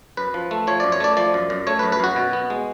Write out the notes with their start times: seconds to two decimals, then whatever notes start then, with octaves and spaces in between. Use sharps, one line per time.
0.17 F#2 B4
0.34 F3
0.51 A3
0.67 F3 C#5
0.80 F#2 D5
0.92 C#5
1.00 A3 D5
1.17 F3 D5
1.34 F#2
1.50 F#2
1.67 A3 C#5
1.79 B4
1.83 F#2
1.92 B4
2.00 F#2 F#4
2.16 B2
2.33 B3
2.50 G#3